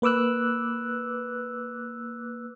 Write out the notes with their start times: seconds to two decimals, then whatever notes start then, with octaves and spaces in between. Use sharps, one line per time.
0.02 A#3 B4 D6 E6 F#6